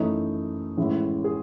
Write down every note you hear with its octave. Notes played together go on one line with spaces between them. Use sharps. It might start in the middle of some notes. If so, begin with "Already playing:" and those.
Already playing: F#2 E3 A3 D#4
A1 A2 G#3 E4
G#4